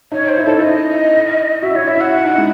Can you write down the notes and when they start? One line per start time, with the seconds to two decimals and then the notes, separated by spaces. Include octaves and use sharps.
0.12 D#4 C#5
0.29 C5
0.38 E4
0.45 D#4 A4
0.59 E4 D#5
1.62 F#4 E5
1.75 E4 C#5
1.88 E4 E5
2.01 F#5
2.13 F#4
2.25 D#4
2.30 E4
2.38 G#3